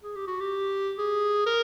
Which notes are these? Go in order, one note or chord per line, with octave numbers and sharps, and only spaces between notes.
G#4
G4
F#4
G4
G#4
A#4